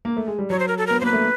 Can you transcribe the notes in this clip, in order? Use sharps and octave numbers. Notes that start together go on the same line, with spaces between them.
A#3
A3
G#3
G3
F#3 C#5
C5
A#4
A4
B3 A#4
A#3 B4 C5
A3